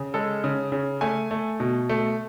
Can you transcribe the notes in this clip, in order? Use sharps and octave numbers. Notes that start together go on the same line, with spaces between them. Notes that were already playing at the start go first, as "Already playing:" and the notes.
Already playing: C#3
G#3 A4
C#3
C#3
A3 G#5
A3
B2
A3